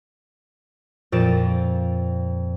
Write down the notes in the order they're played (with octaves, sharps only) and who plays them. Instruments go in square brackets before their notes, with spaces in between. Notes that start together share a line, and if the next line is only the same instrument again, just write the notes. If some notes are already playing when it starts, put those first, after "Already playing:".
[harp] F2 A#2 D5 E7